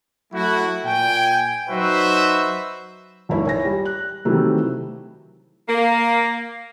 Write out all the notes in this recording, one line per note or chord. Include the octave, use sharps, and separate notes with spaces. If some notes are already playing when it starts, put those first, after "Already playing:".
F#3 A3 E4 F#4
A#2 G5 G#5
F#3 D#4 F#4 B4 C5 E5
F#1 C#2 D#4 E4 C#5
C#5 G#5 A#6
G3
F#6
C3 D#3 E3 F#3 G3 A3
A#3